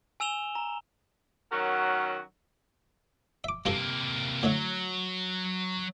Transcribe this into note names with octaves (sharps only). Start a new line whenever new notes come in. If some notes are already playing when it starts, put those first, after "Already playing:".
G#5 E6 E7 F7 G7
A#5
D#3 F#3 C#4 F#4 A#4
E5 D6
G2 C3 A#3 F4 A4
A2 D3 F#3 E5